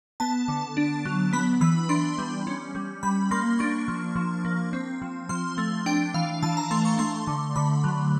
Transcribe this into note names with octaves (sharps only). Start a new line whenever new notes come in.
B3 A5
D3
D4
F#3
B3 B5
E3 B5
D4 C6
G3
C#4
G3
G3 B5
A#3 C6
D4 C#6
F3
F3
A#3
C4
F3
F3 C6
A3
D4 G5
E3 F5
E3 A5
A#5
A3 C6
C#6
A3 C6
D3
D3 B5
F#3